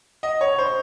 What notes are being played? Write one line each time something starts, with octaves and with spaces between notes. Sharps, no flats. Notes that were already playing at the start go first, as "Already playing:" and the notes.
D#5
C#5
C5